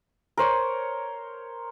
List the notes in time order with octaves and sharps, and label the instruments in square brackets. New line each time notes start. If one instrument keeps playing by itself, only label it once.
[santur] A#4 C5 C#5